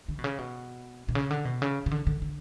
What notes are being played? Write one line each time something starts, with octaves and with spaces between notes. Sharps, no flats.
D3
B2
C#3
B2
B2
C#3
D3
B2
C#3
C#3
D3
D3
D3